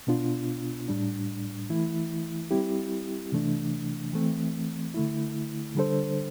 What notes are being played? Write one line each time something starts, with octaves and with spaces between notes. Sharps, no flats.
B2 B3 D4 F4
A2 G3 D4
E3 A3 E4
G3 C4 E4 G4
C3 E3 A3 D4
E3 A3 C4
D3 A3 E4
D3 G3 D4 A4 C5